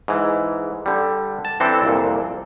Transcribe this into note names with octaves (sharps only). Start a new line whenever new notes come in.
G#2 E3
D3 G3
A5
E3 C4 D4 E4 A4
C2 F2 A#2